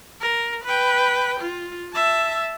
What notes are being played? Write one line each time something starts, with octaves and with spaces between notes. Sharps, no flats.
A#4
B4 G5
F4
E5 A5